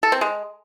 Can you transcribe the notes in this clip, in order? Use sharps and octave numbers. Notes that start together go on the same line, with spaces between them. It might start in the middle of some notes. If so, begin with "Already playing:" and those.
A4
C4
G#3